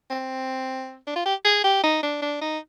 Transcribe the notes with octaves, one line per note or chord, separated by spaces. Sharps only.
C4
D4
F4
G4
G#4
G4
D#4
D4
D4
D#4